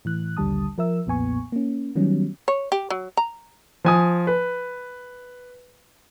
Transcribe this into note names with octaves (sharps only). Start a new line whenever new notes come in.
A2 E3 F#6
A#1 D#2 D3 G3 A5 D#6
F3 A#4 E5 E6
B1 F2 A#2 B3 G#5 C#6
A#3 C#4
D#3 F#3 G3 B3 C#4
C#5
G4
F#3
A#5
F3 G#5 D#6
B4